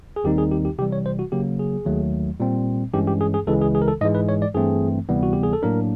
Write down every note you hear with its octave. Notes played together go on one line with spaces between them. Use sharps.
G#4
D#2 D#3 G3 C4 D#4 G4
G#4
G4
G4
C3 E3 G3 G4
C#5
C5
F#4
C#3 F#3 A#3 G4
G#4
D#2 D#3 F#3 A3
A#2 G3 C4
G2 E3 G#3 C#4 G4
G4
G#4
G#4
C#2 C#3 E3 G#3 A4
G#4
G#4
A#4
A4
G#2 E3 G#3 D#5
B4
C#5
D5
G2 E3 A3 C4 G#4
D2 C3 E3 G3 B3
F#4
G4
G#4
A4
A2 F#3 A#3 D4 A#4